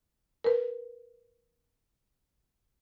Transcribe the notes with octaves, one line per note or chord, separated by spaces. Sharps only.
A#4 B4